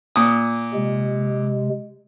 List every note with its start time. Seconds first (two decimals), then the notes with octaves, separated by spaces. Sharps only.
0.16 A#2 D#6
0.74 C3 G#3